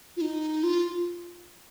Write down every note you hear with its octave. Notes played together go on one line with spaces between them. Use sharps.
F4
D#4
F4